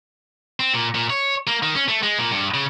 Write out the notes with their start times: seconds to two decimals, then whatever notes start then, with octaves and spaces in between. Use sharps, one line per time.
0.60 C4
0.74 A#2
0.95 A#2
1.10 C#5
1.47 A#3
1.63 D#3
1.75 C#4
1.88 A3
2.03 G#3
2.19 A#2
2.31 G2
2.54 C#3